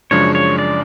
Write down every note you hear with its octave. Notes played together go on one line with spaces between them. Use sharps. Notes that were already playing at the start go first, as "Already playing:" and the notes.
F#2 C#3 F3 G#3 D4 C#5
C#5
D5